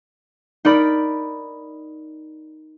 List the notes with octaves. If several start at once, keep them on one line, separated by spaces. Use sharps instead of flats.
D#4 A#4 D5 B5